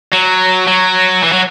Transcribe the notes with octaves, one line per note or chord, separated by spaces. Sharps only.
F#3
F#3
E3
F#3